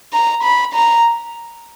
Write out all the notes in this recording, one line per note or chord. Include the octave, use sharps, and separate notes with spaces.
A#5
B5
A#5